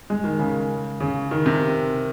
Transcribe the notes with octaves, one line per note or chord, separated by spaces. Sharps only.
G#3
D#3
C#3
C#3
D#3
C3